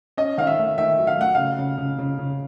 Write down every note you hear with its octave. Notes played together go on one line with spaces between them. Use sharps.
C#4 D#5
D#3 F5
E5
A3
D#3 E5
F#3
F5
A3 F#5
C#3 F5
C#3
C#3
C#3
C#3